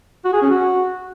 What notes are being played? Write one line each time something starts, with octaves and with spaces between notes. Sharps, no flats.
F#4
G#4
C#4
F#4